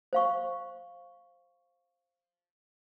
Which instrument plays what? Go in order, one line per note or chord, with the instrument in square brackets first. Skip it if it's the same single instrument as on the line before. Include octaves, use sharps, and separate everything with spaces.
[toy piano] C5 F5 C#6